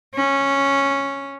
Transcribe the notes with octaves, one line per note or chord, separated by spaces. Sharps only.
C#4